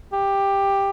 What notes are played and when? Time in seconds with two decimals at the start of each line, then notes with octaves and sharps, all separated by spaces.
0.13 G4